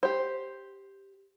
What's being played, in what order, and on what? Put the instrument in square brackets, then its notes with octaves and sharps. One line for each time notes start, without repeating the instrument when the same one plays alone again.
[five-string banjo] G4 C5